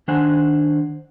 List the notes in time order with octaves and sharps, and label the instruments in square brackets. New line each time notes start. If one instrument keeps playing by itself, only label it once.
[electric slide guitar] D#3 D4 C5 F#5 G#5